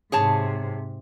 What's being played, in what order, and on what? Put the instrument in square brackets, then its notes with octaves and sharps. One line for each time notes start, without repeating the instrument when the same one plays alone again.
[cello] G#2 C3 [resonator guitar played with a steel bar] G#4 C#5 A5